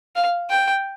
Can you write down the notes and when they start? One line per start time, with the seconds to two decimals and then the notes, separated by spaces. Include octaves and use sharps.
0.16 F5
0.50 G5